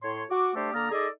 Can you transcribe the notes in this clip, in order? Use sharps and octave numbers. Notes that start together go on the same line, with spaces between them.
A2 C#5 C6
F#4 D6
G3 A3 D4 G4 A4 C5
D3 A#3 D5 A#5 D#6 F6
D#4 G#4 A4 D5 D#5